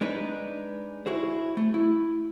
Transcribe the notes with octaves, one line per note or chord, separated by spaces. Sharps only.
G#3 D4 D#4 B4
E4 F#4 G#4 C5
A3
E4